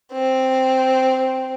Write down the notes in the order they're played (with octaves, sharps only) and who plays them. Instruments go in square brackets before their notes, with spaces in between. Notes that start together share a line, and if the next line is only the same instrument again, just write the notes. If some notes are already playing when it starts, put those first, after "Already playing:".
[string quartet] C4